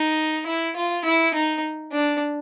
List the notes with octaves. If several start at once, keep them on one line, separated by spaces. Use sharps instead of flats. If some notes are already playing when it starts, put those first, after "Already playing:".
Already playing: D#4
E4
F4
E4
D#4
D4